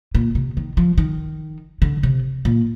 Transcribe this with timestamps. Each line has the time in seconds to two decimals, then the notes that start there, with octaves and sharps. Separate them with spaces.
0.15 A#2
0.35 C3
0.57 D#3
0.77 F3
0.98 D#3
1.82 D3
2.03 C3
2.45 A#2